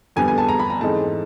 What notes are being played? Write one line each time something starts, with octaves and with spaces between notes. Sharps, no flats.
F2 D3 G3 B3 G#5
G#5
A5
A#5
B5
A#5
G#2 E3 A3 C4 D#4 A5